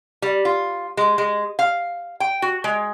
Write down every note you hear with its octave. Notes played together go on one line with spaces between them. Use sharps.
G3
F4
G#3
G#3
F5
G5
F#4
G#3